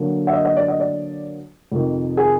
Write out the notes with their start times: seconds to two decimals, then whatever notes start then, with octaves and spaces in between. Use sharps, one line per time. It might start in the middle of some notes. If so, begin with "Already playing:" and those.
Already playing: D3 F#3 A#3
0.27 E5
0.33 D#5
0.45 D#5
0.57 D5
0.68 D#5
0.80 D5
1.72 F2 C3 D#3
2.17 G#4